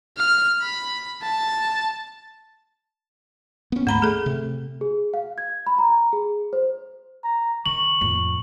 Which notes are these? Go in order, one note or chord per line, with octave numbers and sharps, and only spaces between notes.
F6
B5
A5
B3 C#4
D2 G#2 A3 A#5 B5
A3 G#4 A4
C3
G#4
F5
G#6
B5
A#5
G#4
C5
A#5
D#3 C#6 F#7
F2 A2